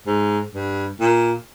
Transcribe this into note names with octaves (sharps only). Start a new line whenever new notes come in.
G#2
G2
A#2